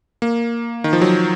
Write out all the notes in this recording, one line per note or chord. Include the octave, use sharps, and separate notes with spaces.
A#3
D#3
F3
F#3